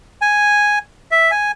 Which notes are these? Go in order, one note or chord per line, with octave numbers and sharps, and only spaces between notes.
G#5
E5
G#5